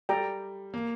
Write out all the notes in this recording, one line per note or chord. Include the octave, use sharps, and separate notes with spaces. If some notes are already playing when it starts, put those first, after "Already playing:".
G3 A4 D5 G5 A#5
A#3